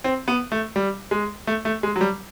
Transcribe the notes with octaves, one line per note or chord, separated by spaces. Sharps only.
C4
B3
A3
G3
G#3
A3
A3
G#3
F#3
G3